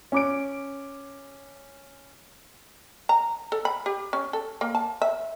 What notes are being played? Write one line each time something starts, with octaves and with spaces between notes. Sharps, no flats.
C#4 D6 D7
A#5
A4
B5
G4
C#4
A4
A#3
A5
E5